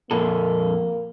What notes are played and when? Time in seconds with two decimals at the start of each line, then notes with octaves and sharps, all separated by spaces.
0.11 F2 A#2 A#3 A4